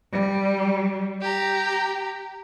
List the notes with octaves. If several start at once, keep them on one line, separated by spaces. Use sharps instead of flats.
G3
G4 A#5